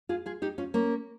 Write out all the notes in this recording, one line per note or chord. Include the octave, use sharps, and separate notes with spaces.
F4 G#4
F4 G#4
D#4 G4
C#4 F4
A#3 C#4